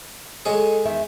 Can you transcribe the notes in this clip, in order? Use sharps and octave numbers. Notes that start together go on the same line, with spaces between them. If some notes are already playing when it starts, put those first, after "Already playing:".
G#3 G#4 A4 C#5 D#5
E2 D#3 E5